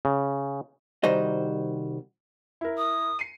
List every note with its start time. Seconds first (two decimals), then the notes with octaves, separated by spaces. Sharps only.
0.05 C#3
1.03 C2 D#3 G3 F#4 C5 D#5
2.61 E4 A#4
2.78 D#6
3.19 C7 C#7 D#7